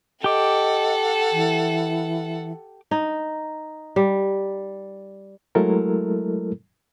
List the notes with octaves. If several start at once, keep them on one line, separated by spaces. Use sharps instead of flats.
G4 A4 D#5 F#5 D6
E3
D#4
G3
F#3 G#3 A3 E4 A4 A#4